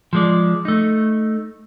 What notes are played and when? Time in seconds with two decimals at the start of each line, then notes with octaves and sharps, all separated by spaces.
0.13 F3 G#3 D5
0.65 A3 D#4